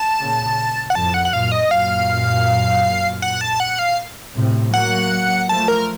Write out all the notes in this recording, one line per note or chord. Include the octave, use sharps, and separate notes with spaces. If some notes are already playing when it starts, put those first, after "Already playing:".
Already playing: A5
A#2 C#3
F#5
F2 A2 A5
F#5
F#5
F#2 A#2 F5
D#5
F#2 A#2 F5
F#5
A5
F#5
F5
A2 C3
F#3 A#3 F#5
F3 A3 A5
A#4